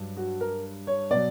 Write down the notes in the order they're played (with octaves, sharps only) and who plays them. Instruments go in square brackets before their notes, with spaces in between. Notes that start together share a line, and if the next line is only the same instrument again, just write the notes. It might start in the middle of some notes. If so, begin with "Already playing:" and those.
Already playing: [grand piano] G2 F#3
F#4
A#4
C#5
B2 F#3 D5